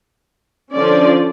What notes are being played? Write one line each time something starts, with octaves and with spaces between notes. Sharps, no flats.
D3 F3 C#4 D5